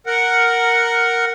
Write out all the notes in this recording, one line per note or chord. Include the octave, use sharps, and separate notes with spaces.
A#4 F#5